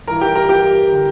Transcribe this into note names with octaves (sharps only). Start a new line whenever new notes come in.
G2 E3 A#4 A#5
G4 G5
A#4 A#5
G4 G5
D3